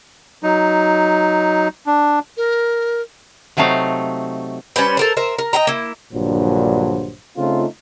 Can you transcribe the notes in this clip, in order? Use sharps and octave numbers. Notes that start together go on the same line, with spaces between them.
F#3 D#4
D4
A#4
C3 F#3 A3 D#4 F5
G3 C#4 B4 C5
A4 A#4 C5
A#4 C5 E5
A#4
D#5 E5 G5 A#5
A#3 E4
A#1 G2 A#2 D3 F#3 C5
C#3 A3 C4 D#4 F4